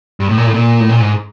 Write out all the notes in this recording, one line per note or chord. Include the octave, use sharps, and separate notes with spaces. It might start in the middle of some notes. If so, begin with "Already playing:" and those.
G2
A2
A#2
A2
A#2
A2
A#2
G#2